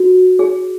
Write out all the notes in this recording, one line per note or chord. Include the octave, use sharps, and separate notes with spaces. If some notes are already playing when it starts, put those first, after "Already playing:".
Already playing: F#4
G#4